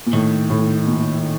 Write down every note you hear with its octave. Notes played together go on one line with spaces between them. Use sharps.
A#2
A2 D#3
A2
A#2